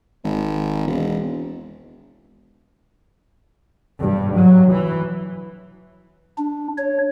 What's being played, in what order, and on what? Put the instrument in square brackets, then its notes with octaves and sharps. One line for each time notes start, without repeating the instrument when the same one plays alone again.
[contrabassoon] G#1
E1
[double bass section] G2
F#3
E3
[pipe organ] D4
C#5